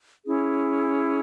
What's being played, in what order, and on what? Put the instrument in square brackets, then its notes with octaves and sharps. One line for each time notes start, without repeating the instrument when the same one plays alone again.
[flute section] C#4 E4 G#4